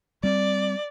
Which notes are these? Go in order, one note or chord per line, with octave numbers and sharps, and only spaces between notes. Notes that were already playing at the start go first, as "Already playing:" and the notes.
G3 C4 D5